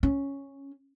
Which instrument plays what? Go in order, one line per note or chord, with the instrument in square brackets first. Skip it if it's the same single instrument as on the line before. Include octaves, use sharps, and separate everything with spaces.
[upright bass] C#4